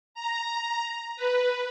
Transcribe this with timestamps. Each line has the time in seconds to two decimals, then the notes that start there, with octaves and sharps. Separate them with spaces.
0.14 A#5
1.17 B4